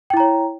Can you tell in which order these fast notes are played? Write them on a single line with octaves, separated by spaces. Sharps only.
G5 E4 A#5 C#5